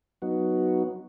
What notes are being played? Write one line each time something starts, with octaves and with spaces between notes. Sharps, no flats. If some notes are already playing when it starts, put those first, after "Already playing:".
F#3 B3 D#4 F#4